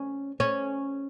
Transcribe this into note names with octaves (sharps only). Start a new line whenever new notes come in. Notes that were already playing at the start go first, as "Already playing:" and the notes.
Already playing: C#4
C#4